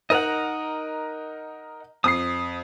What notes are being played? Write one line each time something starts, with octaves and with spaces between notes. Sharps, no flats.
D#4 A#4 D#5 F#5 A#5
F2 D#6 C7